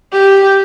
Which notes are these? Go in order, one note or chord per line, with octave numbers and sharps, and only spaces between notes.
G4